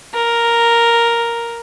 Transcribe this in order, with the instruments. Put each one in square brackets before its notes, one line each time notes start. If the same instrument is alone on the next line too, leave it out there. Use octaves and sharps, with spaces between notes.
[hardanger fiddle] A#4